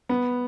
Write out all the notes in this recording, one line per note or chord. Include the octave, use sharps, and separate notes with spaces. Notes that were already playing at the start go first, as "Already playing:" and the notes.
B3